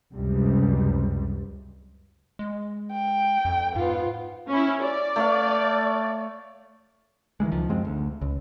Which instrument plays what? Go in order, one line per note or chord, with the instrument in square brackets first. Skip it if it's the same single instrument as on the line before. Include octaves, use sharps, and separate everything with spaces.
[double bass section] C#2 F#2 C3 G3
[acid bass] G#3
[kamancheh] G5
[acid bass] F2
[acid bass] G#2 [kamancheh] B3 F4
[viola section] C#4 E4
D5
[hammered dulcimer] A3 C#5 F5
[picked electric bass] D#3 E3 G3 G#3
C#2 D#3 F3
F#2 F3 G#3 C4
D2
C#2